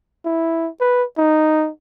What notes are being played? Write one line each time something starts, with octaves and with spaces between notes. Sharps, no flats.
E4
B4
D#4